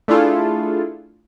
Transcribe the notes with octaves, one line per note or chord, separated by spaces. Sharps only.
A3 D4 E4 F4 G#4 A4